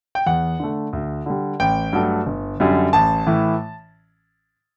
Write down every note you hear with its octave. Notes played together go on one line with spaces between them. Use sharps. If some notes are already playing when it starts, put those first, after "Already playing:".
G5
E2 F#5
D3 A3
D2
D3 G3
A1 G5
G2 F#3 A3
G1
F#2 D3 G3
A1 A5
A2 E3